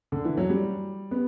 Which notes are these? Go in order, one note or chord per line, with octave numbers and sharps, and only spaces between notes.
D3
E3
F#3
G3
B3